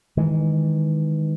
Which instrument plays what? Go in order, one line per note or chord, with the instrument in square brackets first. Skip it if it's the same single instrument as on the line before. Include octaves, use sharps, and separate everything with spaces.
[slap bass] D#3 E3 G#3